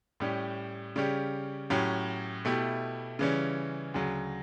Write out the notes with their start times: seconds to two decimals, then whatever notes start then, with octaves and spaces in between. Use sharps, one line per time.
0.20 A2 G3 C#4 G4
0.96 C#3 G3 C#4 G4
1.70 A2 F#3 C#4 G4
2.45 B2 A3 E4 G4
3.19 C#3 E3 G3 C#4
3.94 D2 C#3 F#3